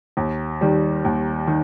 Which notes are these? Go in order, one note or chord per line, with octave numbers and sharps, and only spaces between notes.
D#2
D#3 G3
D#2
D#3